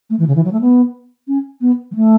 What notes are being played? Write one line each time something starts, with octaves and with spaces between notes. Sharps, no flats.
A3
E3
C#3
E3
F#3
A3
B3
C#4
B3
F#3
A3